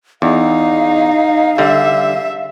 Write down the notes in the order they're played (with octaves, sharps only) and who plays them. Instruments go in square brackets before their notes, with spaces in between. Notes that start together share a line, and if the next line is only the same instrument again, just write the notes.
[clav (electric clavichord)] E2 [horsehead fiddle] D#4 [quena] F5
[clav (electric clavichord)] D3 G3 [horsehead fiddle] E5